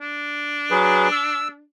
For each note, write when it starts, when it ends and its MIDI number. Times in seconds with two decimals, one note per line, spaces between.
0.01 1.64 62
0.70 1.08 54
0.70 1.08 68
0.70 1.08 71
1.12 1.48 88